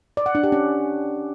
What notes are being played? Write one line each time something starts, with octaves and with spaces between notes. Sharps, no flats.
D5
F#5
D4
G4
C#4